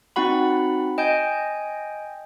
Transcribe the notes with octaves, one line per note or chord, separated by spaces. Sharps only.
C4 D#4 F#4 F#5 B5
D#5 G5 G#5 G6